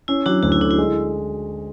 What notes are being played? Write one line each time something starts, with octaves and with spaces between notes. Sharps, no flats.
C#4 E4
F#3 D4 F#4
D2 F#4
E4
D3 D4
E4
G#3